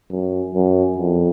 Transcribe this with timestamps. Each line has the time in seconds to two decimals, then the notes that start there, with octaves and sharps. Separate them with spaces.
0.11 F#2
0.55 F#2
0.98 F2